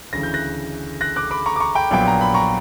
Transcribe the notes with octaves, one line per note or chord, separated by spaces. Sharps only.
D2 C#3 E3 A#6
G6
F#6 A#6
F#6 A#6
D6 F#6
B5 D6
A#5 C#6
D6
A#5 C#6
G5 B5
A#1 A#2 F#3 B3 G5
A#5
B5
A#5 C#6